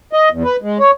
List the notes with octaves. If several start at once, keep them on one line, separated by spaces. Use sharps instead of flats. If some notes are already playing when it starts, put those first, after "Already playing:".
D#5
E2
B4
G#3
C#5